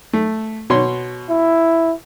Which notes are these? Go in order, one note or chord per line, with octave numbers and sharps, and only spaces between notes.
A3
B2 C#5 C6
E4